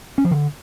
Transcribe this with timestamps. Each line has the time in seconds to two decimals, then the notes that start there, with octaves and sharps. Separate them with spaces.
0.18 C#4
0.24 F3
0.31 D3